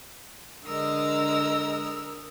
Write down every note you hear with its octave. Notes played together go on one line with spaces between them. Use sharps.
D3 G#3 A#4 D#6 E6